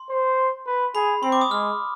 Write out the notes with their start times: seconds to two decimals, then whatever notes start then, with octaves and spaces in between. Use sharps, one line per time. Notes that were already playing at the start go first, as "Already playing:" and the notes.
Already playing: C6
0.10 C5
0.67 B4
0.95 G#4 B5
1.23 C4 C6
1.32 D6
1.41 D#6
1.51 G#3 F6